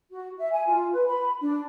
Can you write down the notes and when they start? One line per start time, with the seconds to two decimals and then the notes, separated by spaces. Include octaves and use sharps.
0.11 F#4
0.38 E5
0.52 G#5
0.67 F4
0.93 B4
1.07 B5
1.41 D4